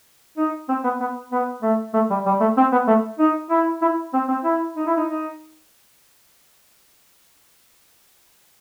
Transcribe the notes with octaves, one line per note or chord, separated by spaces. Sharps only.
D#4
C4
B3
B3
B3
A3
A3
G3
G3
A3
C4
B3
A3
D#4
E4
E4
C4
C4
E4
D#4
E4
D#4
D#4